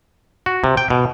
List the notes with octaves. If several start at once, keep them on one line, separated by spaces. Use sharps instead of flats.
F#4
C3
G5
B2